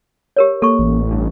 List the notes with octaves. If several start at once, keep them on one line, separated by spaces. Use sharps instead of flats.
G4 A#4 C#5
A#3 A4 C#6
A1
G2